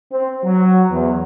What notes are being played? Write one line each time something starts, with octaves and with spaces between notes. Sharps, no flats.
C4
F#3
E2